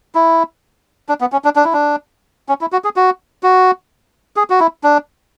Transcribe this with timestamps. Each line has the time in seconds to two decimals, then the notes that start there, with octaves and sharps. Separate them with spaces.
0.15 E4
1.09 D4
1.21 B3
1.32 C#4
1.44 D4
1.56 D4
1.64 E4
1.73 D4
2.49 C#4
2.61 E4
2.72 F#4
2.84 G#4
2.96 F#4
3.43 F#4
4.36 G#4
4.50 F#4
4.60 E4
4.84 D4